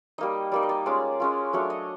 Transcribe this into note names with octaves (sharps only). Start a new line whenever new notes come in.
G3 A#3 D#4 D#5
G3 A#3 D#4 D5
D#5
D5
G#3 C#4 F4 D5
G#3 C#4 F4
F#3 A3 D4 C#5
D#5